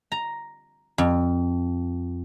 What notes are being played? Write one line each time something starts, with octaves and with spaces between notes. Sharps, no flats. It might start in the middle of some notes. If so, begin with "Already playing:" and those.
A#5
F2